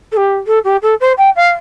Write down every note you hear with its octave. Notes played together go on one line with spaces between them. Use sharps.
A4
G4
A4
G4
A4
C5
G5
F5